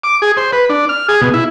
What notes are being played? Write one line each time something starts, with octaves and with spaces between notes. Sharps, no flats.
D6
G#4
C5
B4
D4
F6
G#4
B2
E4